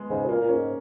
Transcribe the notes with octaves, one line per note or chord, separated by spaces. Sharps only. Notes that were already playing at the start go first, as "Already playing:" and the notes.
Already playing: G#3 B3
G#2 C#3
B2
A#2 A#3
A#2
C#4
G#2